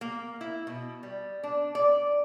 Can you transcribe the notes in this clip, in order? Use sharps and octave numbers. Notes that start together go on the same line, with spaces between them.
A#3
E4
B2
G3
D4
D5